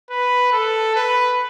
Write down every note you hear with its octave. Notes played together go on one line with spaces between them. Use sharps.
B4
A4
B4